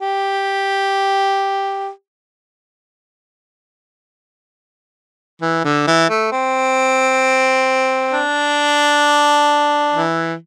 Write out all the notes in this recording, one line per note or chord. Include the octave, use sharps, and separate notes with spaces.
G4
E3
D3
E3
A3
C4
D4
E3